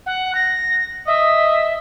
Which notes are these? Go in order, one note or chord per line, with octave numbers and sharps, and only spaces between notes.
F#5
A#6
D#5 E5